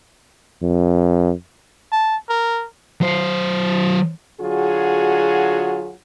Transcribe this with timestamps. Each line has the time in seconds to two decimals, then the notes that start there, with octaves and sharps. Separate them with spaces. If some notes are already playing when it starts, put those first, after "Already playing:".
0.63 F2
1.92 A5
2.29 A#4
3.01 F#3 C5
4.40 D3 F#3 F4 F#4 G#4